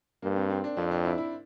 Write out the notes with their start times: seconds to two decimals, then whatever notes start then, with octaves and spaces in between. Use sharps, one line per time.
0.22 G2 A#3
0.36 C4
0.50 C4
0.64 D4
0.77 F2 C4
0.91 D4
1.05 E4
1.18 E4